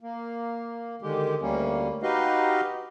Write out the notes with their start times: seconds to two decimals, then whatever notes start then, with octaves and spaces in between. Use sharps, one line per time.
0.01 A#3
1.02 D3 D#3 G#3 G4
1.42 D2 G3 A#3 C#4
2.03 D#4 F#4 G4 B4 D#5 F5